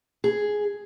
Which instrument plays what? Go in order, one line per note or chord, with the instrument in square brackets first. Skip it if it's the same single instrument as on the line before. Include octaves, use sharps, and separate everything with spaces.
[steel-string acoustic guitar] G#4